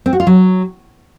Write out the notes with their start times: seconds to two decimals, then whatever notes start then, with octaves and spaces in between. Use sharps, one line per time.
0.06 C4
0.13 F#4
0.20 F4
0.27 F#3